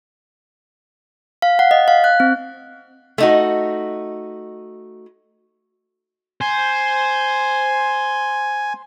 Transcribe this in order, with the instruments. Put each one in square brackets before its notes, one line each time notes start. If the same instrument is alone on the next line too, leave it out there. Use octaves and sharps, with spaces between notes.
[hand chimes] F5
F#5
D#5
F5
F#6
C4
[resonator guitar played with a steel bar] A3 D#4 F#4
[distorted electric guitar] C5 [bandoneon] G#5